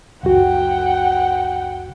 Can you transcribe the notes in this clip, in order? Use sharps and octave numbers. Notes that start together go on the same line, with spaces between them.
C#2 F#2 F#4 F#5 G5